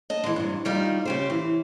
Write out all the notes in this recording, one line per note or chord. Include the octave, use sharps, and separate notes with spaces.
D#5 A5
E3 G#3
G2 C3
D#3 G3 D#4 F4
C#3 G4 C5
E3